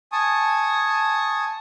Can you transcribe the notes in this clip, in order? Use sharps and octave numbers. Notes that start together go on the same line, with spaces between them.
G#5 A5 C#6 D#6